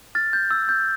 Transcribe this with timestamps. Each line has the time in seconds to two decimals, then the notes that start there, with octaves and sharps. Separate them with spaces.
0.15 F6 A6
0.33 G6
0.51 E6
0.69 G6